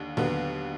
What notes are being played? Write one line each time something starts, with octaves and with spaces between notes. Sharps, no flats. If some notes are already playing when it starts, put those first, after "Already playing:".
Already playing: D#2 D3
D#2 D3 F#3 B3